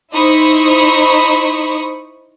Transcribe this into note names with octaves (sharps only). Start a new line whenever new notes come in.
D#4 E4 C5 B5 C#6 D#6